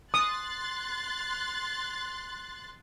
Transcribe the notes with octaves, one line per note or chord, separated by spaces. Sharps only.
C6 D#6 F#6 A6